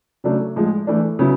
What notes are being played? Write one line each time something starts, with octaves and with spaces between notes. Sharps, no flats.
C#3 F#3 A3 D4
A2 F3 G#3
E3 A3 D4
C#3 F#3 B3 E4